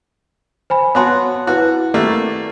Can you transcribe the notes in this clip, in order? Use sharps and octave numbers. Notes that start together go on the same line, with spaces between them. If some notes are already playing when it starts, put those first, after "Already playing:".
C5 G#5 B5
B3 F#4 C#5 A5 C6
E4 F#4 B4
G3 A3 A#3